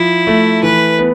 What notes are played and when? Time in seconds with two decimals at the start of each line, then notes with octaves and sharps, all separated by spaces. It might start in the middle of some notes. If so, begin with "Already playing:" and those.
Already playing: F3 E4
0.27 A3
0.63 E3 B4
0.99 B3